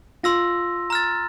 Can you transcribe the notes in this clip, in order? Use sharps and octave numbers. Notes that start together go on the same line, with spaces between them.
F4 C6 E6 A#6
A#5 F6 A6